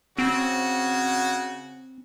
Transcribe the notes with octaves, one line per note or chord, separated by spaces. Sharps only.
C#3 C4 F#4